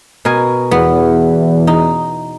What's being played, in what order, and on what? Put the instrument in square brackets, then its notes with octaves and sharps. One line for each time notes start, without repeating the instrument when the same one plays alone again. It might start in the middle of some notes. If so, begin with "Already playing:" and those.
[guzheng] B2 A#4 G#5
[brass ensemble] E2 [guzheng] B3
[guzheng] D#4